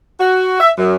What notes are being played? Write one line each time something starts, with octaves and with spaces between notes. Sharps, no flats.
F#4
E5
F#2